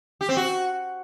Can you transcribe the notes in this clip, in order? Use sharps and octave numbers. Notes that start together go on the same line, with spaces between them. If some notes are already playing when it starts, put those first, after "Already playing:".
G4
C4
F#4